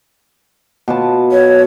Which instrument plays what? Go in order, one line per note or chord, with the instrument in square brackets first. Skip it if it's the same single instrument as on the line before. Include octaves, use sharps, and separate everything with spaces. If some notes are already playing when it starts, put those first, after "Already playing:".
[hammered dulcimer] B2 F4 A5
[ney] C#5